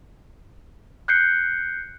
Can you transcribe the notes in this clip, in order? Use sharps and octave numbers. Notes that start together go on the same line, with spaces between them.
F#6 G6 C7 C#7